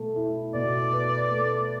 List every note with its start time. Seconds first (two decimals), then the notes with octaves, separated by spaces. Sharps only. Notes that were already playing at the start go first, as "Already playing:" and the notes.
Already playing: B2 A3
0.16 E4
0.54 B2 D5
0.93 B4
1.31 A3